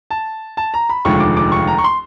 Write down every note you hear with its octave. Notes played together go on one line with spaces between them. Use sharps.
A5
A5
A#5
B5
F1 D#2 D3 F3 G#3 C#6
D6
D6
C#6
A#5
C#6
C6